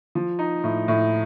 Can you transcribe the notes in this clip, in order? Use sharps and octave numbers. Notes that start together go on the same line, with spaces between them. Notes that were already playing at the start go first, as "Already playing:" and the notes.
F3
D#4
A2
A2